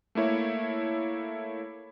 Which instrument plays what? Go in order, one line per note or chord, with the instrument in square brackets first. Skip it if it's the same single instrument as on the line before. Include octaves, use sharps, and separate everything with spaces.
[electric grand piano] A3 A#3 E4 C#5